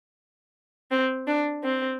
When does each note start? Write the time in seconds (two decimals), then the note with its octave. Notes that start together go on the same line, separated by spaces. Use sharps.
0.90 C4
1.27 D4
1.63 C4